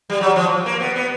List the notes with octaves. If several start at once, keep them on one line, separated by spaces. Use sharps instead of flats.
G3
F#3
F3
A#3
B3
B3